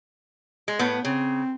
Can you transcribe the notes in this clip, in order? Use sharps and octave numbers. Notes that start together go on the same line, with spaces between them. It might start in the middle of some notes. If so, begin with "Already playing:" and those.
G#3
A2 B3
C#3 C4